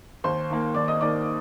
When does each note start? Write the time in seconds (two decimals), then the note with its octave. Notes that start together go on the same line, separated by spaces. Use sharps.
0.24 D#2 C5 C6
0.50 D#3 A#3
0.75 D#2 D5 D6
0.88 D#5 D#6
1.01 D#3 A#3 D5 D6